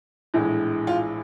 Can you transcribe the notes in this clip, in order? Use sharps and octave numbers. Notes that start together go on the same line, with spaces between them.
A#1 A2 E3 G#3
F4